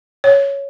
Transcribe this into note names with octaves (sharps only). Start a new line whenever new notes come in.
C#5